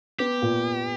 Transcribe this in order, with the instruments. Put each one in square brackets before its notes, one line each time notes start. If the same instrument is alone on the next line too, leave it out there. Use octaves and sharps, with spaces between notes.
[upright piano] B3 [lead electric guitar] G4
[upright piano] A#2